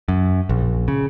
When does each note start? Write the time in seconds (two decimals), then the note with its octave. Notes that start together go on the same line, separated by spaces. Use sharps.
0.08 F#2
0.49 A#1
0.88 C#3